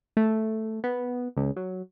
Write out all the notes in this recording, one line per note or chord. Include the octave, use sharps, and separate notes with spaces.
A3
B3
C#2
F#3